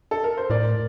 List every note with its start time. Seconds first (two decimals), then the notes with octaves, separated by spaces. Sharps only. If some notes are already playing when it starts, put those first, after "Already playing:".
0.11 A4
0.23 A#4
0.37 C5
0.50 A2 A#4 D5